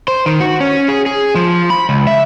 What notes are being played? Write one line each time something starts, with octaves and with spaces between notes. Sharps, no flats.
C5
D#3
F#4
C#4
G#4
G#4
F3
B5
C#2
E5